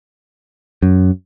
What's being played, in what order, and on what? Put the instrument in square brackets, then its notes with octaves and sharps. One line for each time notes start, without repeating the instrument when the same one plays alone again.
[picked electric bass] F#2